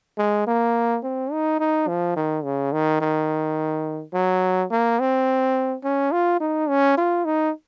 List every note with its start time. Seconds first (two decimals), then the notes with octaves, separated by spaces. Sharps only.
0.18 G#3
0.47 A#3
1.03 C4
1.32 D#4
1.60 D#4
1.88 F3
2.16 D#3
2.44 C#3
2.73 D#3
3.01 D#3
4.14 F#3
4.71 A#3
4.99 C4
5.84 C#4
6.12 F4
6.41 D#4
6.69 C#4
6.97 F4
7.25 D#4